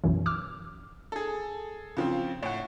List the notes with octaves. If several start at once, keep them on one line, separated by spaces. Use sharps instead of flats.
B1 F#2 E3
D6 E6 F6
G#4 A4
C#3 F3 C4
A2 C#5 F#5